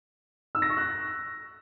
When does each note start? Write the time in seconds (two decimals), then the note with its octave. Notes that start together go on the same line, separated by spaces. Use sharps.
0.55 E6
0.62 A#6
0.70 C#6
0.77 F#6